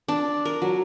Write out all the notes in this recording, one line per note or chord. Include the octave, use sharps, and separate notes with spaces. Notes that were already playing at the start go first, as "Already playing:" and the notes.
D4
A#4
F#3